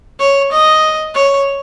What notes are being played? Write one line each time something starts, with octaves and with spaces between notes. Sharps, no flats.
C#5
D#5
C#5